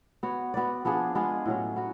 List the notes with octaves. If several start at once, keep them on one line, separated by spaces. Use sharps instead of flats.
B3 F#4 C#5
B3 F#4 B4 D5
F3 B3 D4 G#4
G#3 B3 F4 G#4
A2 F#3 C#4
B3 F#4